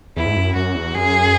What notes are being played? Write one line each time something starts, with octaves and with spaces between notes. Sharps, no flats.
E2 E4
G#2
F#2
F#2 F#4
E2
F#2 G#4